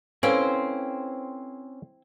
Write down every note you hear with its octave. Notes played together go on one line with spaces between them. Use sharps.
C4 C#4 E4 A4 B4 C5 F5 G5